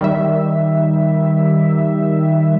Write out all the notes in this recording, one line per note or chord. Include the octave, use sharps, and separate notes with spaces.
D#3 G3 E5